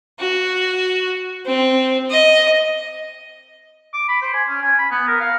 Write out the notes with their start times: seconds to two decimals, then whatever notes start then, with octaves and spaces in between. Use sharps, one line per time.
0.19 F#4
1.46 C4
2.10 D#5
3.93 D6
4.08 B5
4.22 C5
4.34 G#5
4.49 C#4
4.62 G#5
4.79 B5
4.91 B3
5.07 A#4
5.20 F5